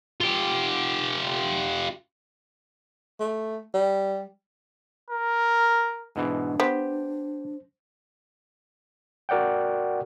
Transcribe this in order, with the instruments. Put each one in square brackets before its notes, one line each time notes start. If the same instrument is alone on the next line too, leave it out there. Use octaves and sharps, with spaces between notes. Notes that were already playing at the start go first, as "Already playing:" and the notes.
[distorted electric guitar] F4 G4
[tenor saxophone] A3
G3
[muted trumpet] A#4
[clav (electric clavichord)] G#2 B2 E3 [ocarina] D4
[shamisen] B3 [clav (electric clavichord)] G4 [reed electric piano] C5
[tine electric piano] F#4 A#4 D5 F#5 G5